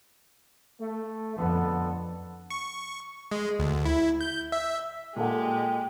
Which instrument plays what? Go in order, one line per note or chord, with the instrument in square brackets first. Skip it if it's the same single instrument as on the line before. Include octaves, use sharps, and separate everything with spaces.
[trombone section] A3
[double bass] F2 [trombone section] D3 B3 A4
[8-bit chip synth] C#6
G#3
D2
E4
G6
E5
[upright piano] A#2 A4 F#5 [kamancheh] G#3 G4